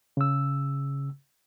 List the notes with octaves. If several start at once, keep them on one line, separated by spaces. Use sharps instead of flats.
C#3 E6